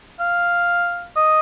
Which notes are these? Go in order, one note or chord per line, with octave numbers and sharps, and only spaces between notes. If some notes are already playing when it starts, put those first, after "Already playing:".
F5
D#5